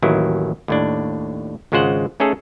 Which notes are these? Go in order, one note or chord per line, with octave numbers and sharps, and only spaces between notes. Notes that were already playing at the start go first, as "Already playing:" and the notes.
A1 D#2 D#3 F#3 E4
D#2 A2 D4
G#1 C#3 G#3 F4 C5 F#5
A3 C#4 D#4 G#4 A4